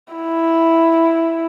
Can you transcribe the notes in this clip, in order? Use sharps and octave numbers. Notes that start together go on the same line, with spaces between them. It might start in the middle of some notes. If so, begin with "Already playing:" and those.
E4